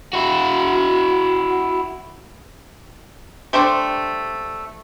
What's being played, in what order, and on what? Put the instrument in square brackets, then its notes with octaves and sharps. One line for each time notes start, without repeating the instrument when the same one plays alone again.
[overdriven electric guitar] E4 F#4
[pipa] G3 A3 C4 D4